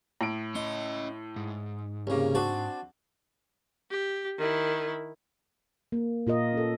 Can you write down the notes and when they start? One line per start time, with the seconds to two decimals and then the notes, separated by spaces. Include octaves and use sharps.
0.21 A2 D7
0.55 C#4 D#5 C6
1.36 G#2
2.07 C2 C#3 A#3 C#4
2.35 C4 D4 F#4 A5
3.90 G4
4.38 D#3 E4
5.92 A#3
6.27 A#2 F4 A#4 D#5
6.53 C#4 A4